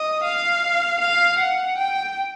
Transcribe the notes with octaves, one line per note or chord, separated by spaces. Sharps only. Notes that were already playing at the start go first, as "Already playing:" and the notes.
Already playing: D#5
F5
F5
F#5
G5